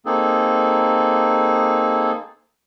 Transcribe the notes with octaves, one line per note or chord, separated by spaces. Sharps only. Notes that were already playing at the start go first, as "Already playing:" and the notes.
A#3 C4 D#4 G#4 A4